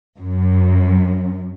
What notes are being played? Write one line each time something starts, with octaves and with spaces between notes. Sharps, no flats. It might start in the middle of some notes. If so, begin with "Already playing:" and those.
F#2